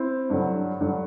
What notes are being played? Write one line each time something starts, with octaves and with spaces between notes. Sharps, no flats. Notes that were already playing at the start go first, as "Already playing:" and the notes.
Already playing: C4 E4
G2 D3 F#3
G2 D3 F#3